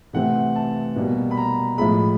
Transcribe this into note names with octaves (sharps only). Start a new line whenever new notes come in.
C3 E3 A3 C4 F#5
A5
B2 G3 A#3
B5
A#5
A2 F3 G#3 B5